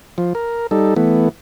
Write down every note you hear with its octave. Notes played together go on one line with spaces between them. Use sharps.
F3
A#4
G3 D#4 A4
E3 A3 B3